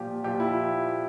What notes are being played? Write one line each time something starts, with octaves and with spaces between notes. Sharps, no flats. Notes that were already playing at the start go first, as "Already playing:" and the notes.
Already playing: A#2 F3 G4
A#2 F3 G4
E4